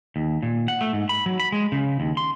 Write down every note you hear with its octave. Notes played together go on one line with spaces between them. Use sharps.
D#2
A#2
F#5
A3
G#2
B5
F#3
B5
G#3
C#3
D#2
C6